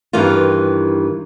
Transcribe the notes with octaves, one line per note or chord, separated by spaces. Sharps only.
G2 D#3 E3 F4